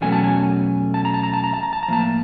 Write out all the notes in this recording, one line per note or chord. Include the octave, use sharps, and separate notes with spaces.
E2 B2 F#3 A3 C#4 G#5
A5
G#5
A5
A#5
A5
A#5
A5
A#5
A5
A#5
A5
A#5
A2 F3 A#3 A5